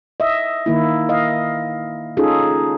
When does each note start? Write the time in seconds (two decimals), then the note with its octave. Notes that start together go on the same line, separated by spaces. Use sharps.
0.20 D#5 E5
0.66 D#3 A#3 E4
1.09 D#5 F5
2.17 C#4 D#4 F4 G#4 A4